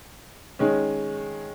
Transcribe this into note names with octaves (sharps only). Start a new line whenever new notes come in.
D#3 G#3 C#4